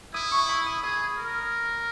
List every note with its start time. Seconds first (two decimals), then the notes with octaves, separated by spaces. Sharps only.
0.14 E4 D#6
0.31 C#6
0.49 B5
0.66 D#6
0.83 G#4 D#6
1.18 A#4